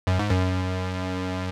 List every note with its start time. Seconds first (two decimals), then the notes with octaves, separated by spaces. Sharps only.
0.07 F#2
0.19 G#2
0.30 F#2